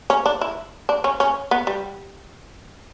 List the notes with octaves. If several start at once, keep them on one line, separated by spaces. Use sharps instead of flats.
C#4
D4
E4
D4
C#4
C#4
B3
G3